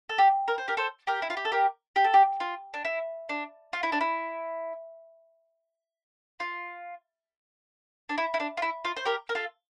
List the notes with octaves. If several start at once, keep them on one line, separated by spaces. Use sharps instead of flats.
A4
G4
A#4
C5
G4 A#4
A4 C5
G4 A#4
E4
F4
G4
A4
G4 A#4
G4
A4
G4
F4
D4
E4
D4
F4
E4
D4
E4
F4
D4
E4
E4
D4
F4
E4
F4
C5
G4 A#4
A#4
F4 A4